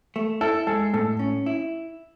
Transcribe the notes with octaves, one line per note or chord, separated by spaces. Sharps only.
A3
E4 A4
G#3 A4
A2 A4
C#4
E4